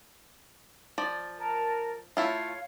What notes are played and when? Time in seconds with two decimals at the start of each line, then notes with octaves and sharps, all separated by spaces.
0.98 F3 D5
1.38 A#4 A5
2.17 A3 E4 F4 C#5 F5